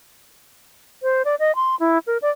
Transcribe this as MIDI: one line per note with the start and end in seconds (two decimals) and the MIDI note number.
1.03 1.23 72
1.25 1.35 74
1.39 1.55 75
1.55 1.75 84
1.80 1.98 64
2.07 2.18 70
2.22 2.30 74